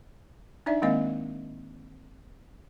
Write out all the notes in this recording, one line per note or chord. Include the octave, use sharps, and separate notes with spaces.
D4 D#4 D5 E5
D#3 G#3 A#3 C4 D#5 F5